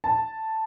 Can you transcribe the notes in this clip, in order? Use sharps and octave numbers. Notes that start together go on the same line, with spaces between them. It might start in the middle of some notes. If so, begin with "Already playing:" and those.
A5